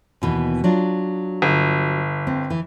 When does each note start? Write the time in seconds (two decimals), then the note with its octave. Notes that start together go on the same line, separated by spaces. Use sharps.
0.22 D#2 B2 E3
0.64 F#3 D4 F4
1.42 G1
2.27 C4
2.50 E3